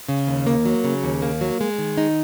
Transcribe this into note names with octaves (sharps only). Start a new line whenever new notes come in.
C#3
D#2
A#3
F#3
C#3
D#2
A#3
F#3
G#3
D#3
D#4